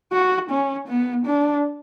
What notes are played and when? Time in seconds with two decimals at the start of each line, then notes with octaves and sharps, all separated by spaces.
0.12 F#4
0.50 C#4
0.88 B3
1.26 D4